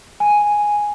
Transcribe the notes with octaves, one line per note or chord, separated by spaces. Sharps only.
G#5